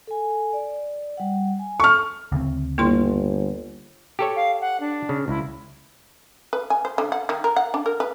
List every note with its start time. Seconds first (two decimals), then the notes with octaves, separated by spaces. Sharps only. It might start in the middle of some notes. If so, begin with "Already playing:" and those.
0.07 A4 G#5
0.53 D5
1.17 G3 F#5
1.59 G#5
1.80 A4 C#6 F6
2.32 D2 C#3 C4
2.78 G1 A#3 E4 C6
4.19 G4 A4 C#5
4.36 F5
4.61 F#5
4.80 D4
5.09 C#3
5.28 C#2 E4
6.53 B4
6.70 G#5
6.85 C5
6.98 D3
7.12 F#5
7.29 D#3
7.44 A#4
7.56 F#5
7.74 D4
7.86 A#4
8.00 B4